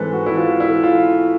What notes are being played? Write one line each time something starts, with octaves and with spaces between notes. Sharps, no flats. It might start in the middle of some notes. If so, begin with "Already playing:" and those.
Already playing: G#2 E3 G#3 C4 A4 B4
F#4
E4
F4
E4
F4